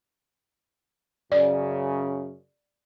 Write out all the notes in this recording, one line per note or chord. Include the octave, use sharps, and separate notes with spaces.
F#2 C#3 D5